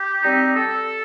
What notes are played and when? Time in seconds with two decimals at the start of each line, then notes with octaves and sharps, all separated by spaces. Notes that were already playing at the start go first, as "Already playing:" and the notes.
Already playing: G4
0.22 G3 C4 D#4
0.55 A4